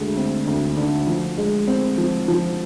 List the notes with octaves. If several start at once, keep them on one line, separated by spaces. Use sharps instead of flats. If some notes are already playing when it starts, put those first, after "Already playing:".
Already playing: D2 D3 G#3
C4
D2
D3
F3
G#3
C4
F3
F3